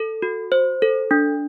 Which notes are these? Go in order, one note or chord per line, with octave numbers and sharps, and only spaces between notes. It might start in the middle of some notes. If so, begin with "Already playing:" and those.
Already playing: A4
F#4
C5
A4
D4